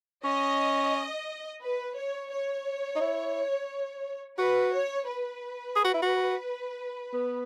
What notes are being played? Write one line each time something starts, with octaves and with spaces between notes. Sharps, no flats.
C#4 D#5
B4
C#5
C#5
D#4
E4
F#4 B4
C#5
B4
G#4
F#4
E4
F#4
B3